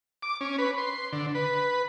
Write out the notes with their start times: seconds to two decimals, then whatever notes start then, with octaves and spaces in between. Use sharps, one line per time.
0.23 D6
0.41 C#4
0.58 B4
0.78 C6
1.13 D3
1.35 B4